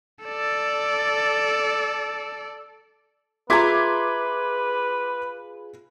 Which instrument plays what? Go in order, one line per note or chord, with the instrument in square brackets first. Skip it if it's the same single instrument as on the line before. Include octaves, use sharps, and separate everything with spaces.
[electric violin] A4 D5
[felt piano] F4 G#4 [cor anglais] B4 [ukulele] E5 A#5 [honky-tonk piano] C6 D6 G#6